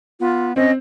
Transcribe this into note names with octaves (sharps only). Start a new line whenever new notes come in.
B3 F4
C4 C#4 D#5